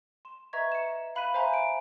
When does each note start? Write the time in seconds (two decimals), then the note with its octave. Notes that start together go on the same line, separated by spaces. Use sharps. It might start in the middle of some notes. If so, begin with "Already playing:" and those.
0.25 C6 E7
0.53 B4 D#5 E5 A#5 C#6 G#6
0.72 C#7 E7
1.15 F5 B5 F#6 B6 D#7
1.34 C5 E5 F5 G#5 A#5 C6
1.54 D7